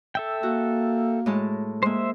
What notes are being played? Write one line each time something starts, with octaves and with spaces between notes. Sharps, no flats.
A4 E5 G5
A#3 F#4
A2 G#3 A5
G#3 A#3 C5 E5